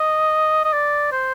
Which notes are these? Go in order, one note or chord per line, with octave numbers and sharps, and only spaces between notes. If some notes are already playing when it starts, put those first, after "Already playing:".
Already playing: D#5
D#5
D5
C5